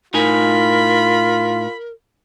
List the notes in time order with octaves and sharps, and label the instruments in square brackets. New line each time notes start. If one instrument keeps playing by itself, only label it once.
[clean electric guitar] A2 D#4 G#5 [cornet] F4 [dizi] A#4 [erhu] B5